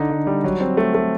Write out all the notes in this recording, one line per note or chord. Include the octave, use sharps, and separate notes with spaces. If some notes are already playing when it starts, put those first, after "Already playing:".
Already playing: D3 D#4
D3
G3
F#3
C4
A3
A3